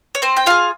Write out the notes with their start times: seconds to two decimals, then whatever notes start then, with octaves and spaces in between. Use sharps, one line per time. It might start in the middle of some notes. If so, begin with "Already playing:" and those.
0.15 C#5
0.22 C4 C5
0.37 G5
0.46 F4 G#4 F5